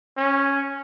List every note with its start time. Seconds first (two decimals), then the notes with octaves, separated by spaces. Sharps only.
0.18 C#4